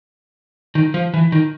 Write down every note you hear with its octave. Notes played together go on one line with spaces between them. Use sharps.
D#3
F3
E3
D#3